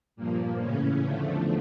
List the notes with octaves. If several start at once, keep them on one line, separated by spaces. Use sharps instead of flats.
G2 A#2 F3 A#3
A2 C#3 E3 C#4
E2 D3 F3 A3